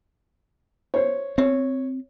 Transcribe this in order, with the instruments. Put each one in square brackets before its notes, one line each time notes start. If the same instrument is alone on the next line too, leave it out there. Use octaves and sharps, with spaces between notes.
[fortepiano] C5 C#5
[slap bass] C4 [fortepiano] C#5